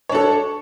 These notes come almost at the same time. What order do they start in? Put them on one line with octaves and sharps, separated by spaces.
C#5 D4 A4